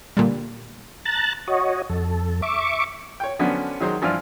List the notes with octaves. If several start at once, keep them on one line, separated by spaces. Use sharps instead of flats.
A#2 D3 G3
A5 A#5 F#6 A6
F#4 C#5 D#5
F2 A4
E5 C#6 D6
C#5 G5
D3 F3 F#3 B3 C#4 D4
D#3 F#3 G#3 C5
G2 E3 F3 F4 D5 F6